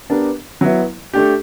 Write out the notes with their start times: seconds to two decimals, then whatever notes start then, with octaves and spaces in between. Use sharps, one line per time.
0.10 B3 D4 G4 A#4
0.61 F#3 B3 E4
1.13 A3 D4 G4